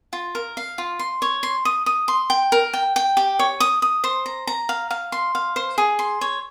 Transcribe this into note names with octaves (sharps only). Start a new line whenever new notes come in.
F4
A#4
F5
F4
C6
C#5
C6
D#6
D#6
C6
G5
A#4
G5
G5
G4
C#5
D#6
D#6
C5
A#5
A#5
F5
F5
C6
F5
C5
G#4
C6
C#5